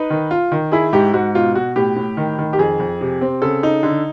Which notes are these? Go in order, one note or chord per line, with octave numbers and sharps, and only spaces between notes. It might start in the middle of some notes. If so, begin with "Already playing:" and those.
Already playing: D#4 B4
D#3
F4
D#3
E4 G#4
G#2 G4
G#2 F#4
B2 F4
B2 F#4
A2 G4
A2
D#3
D#3
G4
F2 G#4
F2
C3
C4
C#3 A4
D#4
D3